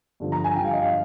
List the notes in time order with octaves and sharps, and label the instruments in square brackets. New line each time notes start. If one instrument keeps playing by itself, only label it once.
[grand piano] G2 D3 F3
A#5
G#5
G2 D3 F3 G5
F5
D#5
F5